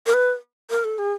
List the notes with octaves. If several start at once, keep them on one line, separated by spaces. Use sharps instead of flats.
A#4
B4
A#4
A4
G#4